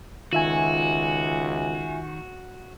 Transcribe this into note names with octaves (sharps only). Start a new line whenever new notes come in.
C#2 D#3 F4 F#4 E5 G#5